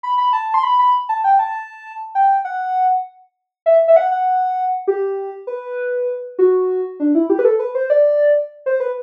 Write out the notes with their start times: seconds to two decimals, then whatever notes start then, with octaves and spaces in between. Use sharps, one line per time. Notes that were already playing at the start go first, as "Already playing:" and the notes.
0.03 B5
0.18 B5
0.33 A5
0.54 C6
0.63 B5
0.79 B5
1.09 A5
1.24 G5
1.39 A5
2.15 G5
2.45 F#5
3.66 E5
3.88 E5
3.96 F#5
4.11 F#5
4.88 G4
5.47 B4
6.39 F#4
7.00 D4
7.15 E4
7.30 G4
7.39 B4
7.45 A4
7.59 B4
7.75 C5
7.90 D5
8.66 C5
8.80 B4